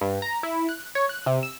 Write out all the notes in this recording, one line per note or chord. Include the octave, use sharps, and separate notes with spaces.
G2
A#5
E4
F#6
C#5
F#6
C3
E6